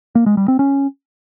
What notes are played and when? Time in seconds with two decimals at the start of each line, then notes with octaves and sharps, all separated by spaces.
0.15 A#3
0.26 G#3
0.37 G3
0.48 C4
0.59 C#4